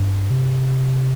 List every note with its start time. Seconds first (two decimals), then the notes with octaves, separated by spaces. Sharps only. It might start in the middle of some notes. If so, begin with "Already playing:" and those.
Already playing: G2
0.30 C3